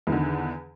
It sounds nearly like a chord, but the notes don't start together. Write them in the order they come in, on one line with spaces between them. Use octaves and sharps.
E2 D#3 D3